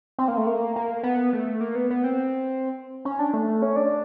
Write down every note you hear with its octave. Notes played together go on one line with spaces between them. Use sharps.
C4
A#3
A3
A#3
A#3
B3
A3
A#3
B3
B3
C4
C#4
D4
A3
C#4
D4